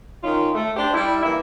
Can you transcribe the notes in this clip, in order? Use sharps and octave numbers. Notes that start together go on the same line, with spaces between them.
D#3 C#4 D#4 F4
A3
D4 G4 C5
G3 E4
E3 A#3 E4